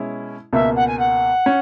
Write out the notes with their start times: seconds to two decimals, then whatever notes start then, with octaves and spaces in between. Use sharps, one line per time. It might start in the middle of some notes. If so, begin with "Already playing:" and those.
Already playing: B2 G#3 C#4 E4
0.53 C#2 B2 A#3 E5
0.76 F#5
0.88 G#5
0.99 F#5
1.46 C#4